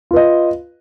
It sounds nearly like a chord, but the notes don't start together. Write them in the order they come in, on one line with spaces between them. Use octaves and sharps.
F4 B4 D#5